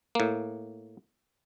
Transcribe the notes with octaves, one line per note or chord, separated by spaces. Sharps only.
A2 A#3